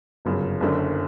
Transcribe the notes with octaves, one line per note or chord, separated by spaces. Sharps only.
G1 F#2 C#3
F#1 F#2 D3